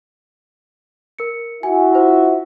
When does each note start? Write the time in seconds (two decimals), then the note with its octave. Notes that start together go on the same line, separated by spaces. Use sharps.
1.18 A#4 C#7
1.63 E4 F#4 E5 G#5
1.92 F4 C5